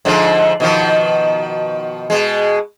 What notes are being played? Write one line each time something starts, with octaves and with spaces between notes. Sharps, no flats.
G#2 D3 F3
B2 D#3 F3
B2 G#3